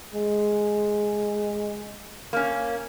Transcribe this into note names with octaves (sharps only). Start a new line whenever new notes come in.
G#3
A#3 C#4